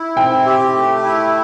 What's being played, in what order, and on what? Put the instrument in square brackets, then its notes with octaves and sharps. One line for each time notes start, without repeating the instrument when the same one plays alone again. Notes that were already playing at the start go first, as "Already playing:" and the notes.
Already playing: [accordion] E4
[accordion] C4 [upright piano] G5
[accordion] G4
A3
E4